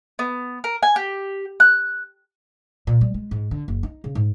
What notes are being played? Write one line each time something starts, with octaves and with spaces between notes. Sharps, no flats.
B3
A#4
G#5
G4
F#6
A#2
G3
G#3
G#2
D3
F#1
D#4
C#3
G#2